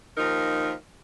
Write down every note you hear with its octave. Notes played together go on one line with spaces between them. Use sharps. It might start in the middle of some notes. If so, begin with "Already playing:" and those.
D#2 F3 D#4 A#4